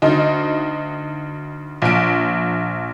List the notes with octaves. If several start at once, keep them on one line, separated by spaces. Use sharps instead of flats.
D2 D#4
A#1 D7